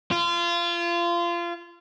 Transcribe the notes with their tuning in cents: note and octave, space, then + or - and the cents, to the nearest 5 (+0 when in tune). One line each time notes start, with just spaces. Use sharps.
F4 -25